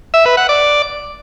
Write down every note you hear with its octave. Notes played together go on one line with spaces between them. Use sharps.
E5
B4
F#5
D5